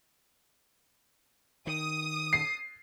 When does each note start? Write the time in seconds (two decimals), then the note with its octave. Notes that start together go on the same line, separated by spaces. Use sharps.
1.67 D#3 D#6
2.33 C7